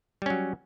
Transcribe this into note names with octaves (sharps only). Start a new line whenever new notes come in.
F#3 G3 C#4